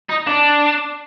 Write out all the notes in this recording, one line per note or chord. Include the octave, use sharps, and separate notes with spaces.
D#4
D4